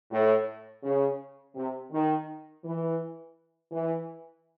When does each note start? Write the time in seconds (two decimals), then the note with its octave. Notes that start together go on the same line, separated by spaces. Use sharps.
0.11 A2
0.83 C#3
1.55 C3
1.92 D#3
2.64 E3
3.72 E3